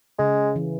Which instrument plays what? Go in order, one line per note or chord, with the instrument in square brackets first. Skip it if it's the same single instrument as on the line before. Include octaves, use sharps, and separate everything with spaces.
[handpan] C#3 [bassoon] G#3
[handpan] E3